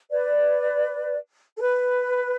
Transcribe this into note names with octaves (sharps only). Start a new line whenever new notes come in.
B4 D5
A4
B4